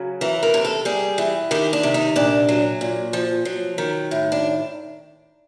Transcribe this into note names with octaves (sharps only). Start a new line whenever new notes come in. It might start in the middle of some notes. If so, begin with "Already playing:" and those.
Already playing: C#3 F#3
E3 A#4
A#4
C3
A4
G3 G#4
E3
D#3 G4
D4
C3
D#4
A#2 D4
F#3
A#2
F3
F#3
D#3
A2
D4